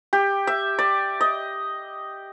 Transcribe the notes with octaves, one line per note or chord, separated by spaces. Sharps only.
G4
E5
D5
D#5